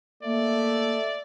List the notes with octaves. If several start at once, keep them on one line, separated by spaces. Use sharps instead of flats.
A3 A#3 D5 E5